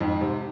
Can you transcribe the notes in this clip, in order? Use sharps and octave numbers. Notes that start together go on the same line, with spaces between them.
F2 G#2
G#2 C3